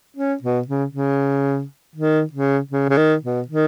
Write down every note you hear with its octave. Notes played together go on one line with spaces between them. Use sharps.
C#4
B2
C#3
C#3
D#3
C#3
C#3
C#3
D#3
B2
D#3